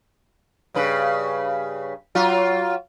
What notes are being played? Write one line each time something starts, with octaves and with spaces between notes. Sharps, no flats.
G2 C#3 B4
F#3 F4